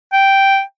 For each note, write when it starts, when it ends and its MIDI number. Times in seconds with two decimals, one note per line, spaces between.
0.13 0.61 79